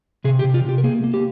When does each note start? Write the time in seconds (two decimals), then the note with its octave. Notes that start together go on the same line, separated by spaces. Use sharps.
0.24 C3 G#4
0.39 G4
0.44 C3
0.54 F4
0.64 C3 G4
0.78 A#4
0.84 A#3 G#4
1.04 A#3
1.14 G4